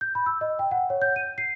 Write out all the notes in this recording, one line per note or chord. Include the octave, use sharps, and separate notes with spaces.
G6
B5
E6
D#5
G5
F#5
C#5
G6
D#7
C7